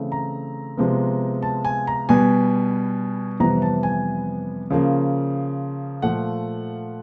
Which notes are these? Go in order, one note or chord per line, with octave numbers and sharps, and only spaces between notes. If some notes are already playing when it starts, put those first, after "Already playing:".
Already playing: C#3 E3 A3 C4
A#5
C3 F3 G#3 B3
A5
G#5
A#5
B2 G3 B3 G#5
F2 C3 E3 G3 B3 A#5
A5
G#5
C#3 F3 A#3
A#2 F3 A3 F#5